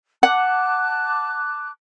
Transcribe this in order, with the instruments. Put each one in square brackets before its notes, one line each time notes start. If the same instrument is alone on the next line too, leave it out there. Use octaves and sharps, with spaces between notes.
[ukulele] F#5 [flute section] A5 D6 F#6